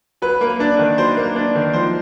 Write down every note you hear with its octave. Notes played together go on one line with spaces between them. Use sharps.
F#3 B4
A#3
D4
D#3
F#3 C5
A#3
D4
D#3
F3 C5